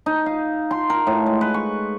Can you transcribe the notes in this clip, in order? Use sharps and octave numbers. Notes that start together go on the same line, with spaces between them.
D#4
F5
C6
A#4
A2
G#3
B4
C#6